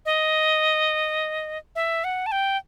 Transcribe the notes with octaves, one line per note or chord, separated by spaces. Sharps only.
D#5
E5
F#5
A5
G5